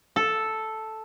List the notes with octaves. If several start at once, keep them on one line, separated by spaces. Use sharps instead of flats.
A4